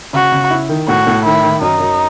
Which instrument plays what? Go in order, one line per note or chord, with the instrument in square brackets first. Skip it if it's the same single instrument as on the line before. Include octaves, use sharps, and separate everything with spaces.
[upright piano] C#3 [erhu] F#4
[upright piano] C#3
E4
D#3
[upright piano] A2 [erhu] F#4
[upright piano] A2
[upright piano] D#3 [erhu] E4
[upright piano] D#3
[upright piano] F#2 [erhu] D#4
[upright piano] F#2